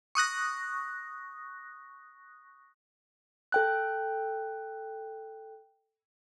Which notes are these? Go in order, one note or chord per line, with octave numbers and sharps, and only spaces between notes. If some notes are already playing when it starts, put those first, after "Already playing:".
C#6 D#6 F#6 A#6
A4 G5 F#6